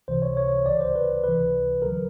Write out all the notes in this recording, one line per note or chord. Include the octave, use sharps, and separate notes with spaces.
C#2 C3 E3 C5
C#5
C#5
D2 C#3 E3 D5
C5
B4
C#2 C3 E3 B4
D2 D3 F#3 A#4